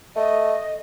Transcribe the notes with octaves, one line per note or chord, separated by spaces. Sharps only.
A3 D#5